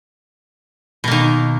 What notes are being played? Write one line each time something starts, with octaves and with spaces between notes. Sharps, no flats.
B2 D#3 A#3